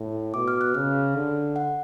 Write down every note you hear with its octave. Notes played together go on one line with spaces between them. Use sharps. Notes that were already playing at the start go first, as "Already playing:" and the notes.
Already playing: A2
B2 D6
F6
F#6
C#3 F6
D3
F#5